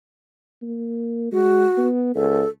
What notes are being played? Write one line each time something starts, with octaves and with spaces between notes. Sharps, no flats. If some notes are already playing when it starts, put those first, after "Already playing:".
A#3
G#3 F#4
B3
C#2 A4